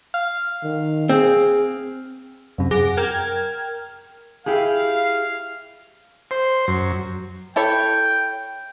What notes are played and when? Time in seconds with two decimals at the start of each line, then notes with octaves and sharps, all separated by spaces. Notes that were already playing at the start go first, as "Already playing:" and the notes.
0.14 F5
0.63 D#3
1.09 C4 G#4
2.58 F#2 C3
2.71 F#2 G#4 F#5 D6 A#6
2.97 A#4 G5 F6 G#6
4.46 E4 G4 G#4 F5
6.31 C5
6.68 F#2
7.56 E4 A4 C#5 G5